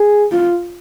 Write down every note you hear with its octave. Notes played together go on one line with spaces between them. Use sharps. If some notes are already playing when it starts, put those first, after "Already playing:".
Already playing: G#4
F4